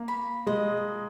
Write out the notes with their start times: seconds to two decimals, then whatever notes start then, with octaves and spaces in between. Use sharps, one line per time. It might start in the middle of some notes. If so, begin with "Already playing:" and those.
Already playing: A#3
0.08 B5
0.47 G#3 D#5